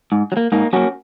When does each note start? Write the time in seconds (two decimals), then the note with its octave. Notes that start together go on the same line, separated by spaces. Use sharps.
0.12 G#2
0.32 F#3
0.37 A#3
0.52 G#2 A#3 D#4
0.73 F#3 A#3 C#4 F#4